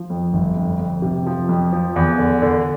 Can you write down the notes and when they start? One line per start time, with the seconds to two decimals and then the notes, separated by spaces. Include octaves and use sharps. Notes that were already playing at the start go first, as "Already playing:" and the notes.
Already playing: F3
0.10 F2
0.33 G1
0.56 F2
0.80 F2
1.02 C3
1.27 F3
1.49 F2
1.73 F3
1.96 E2
2.18 D3
2.42 D3